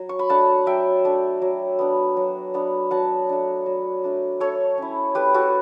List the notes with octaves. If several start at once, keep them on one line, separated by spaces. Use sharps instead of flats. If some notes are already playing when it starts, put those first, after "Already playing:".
Already playing: F#3
C#6
B5
A3 D4 F#5 A5
F#3 E5 G5
A3 D4
F#3
B3 D4
F#3
B3 D4
F#3 F#5 A5
A3 D4
F#3
A3 D4
A3 A4 C#5
C#4 E4
A3 G4 B4
F#4 A4